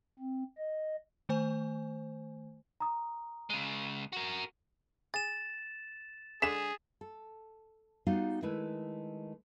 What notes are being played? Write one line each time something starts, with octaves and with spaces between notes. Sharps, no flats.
C4
D#5
D#3 A3 C5 G#5
A#5 D#6
C#3 G#3
F#4 A#4
G#4 A6 E7
D3 G#3 G#4 B6 E7
A4
G3 B3 D#4 F4 F#4 F5
D#3 G#3 A3 E4 B4